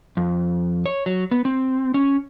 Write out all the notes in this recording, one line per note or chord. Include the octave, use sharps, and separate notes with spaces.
F2
C#5
F#3
B3
C4
C#4